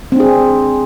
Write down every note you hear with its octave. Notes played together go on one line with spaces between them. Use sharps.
C4 D4 G#4